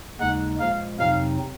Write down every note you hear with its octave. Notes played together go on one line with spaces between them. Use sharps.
D#2 C#3 G#3 D#4 F#5
A#2 F3 G#3 F5
F2 C3 F#3 C4 D#4 F5